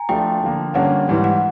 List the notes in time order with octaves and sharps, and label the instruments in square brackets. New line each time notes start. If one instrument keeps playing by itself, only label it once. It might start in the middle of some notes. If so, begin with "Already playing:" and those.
Already playing: [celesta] G#5 A#5
[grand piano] F3 A3 D4 F4 [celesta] G5
[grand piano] D3 F3 A#3
[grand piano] G2 D3 G3 A#3 C#4 [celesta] F#5
[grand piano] G#2 E3 G3
[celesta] F#5